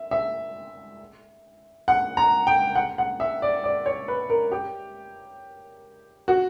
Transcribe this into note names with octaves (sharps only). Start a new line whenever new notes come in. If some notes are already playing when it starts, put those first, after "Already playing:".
Already playing: E5
E5
F#5
A#5
G5
F#5
F#5
E5
D5
D5
C#5
B4
A#4
G4
F#4